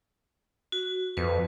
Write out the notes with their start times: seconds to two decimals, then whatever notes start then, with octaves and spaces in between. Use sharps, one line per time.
0.72 F#4
1.17 F2 B4